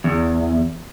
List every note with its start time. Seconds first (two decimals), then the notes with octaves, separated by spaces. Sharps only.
0.04 E2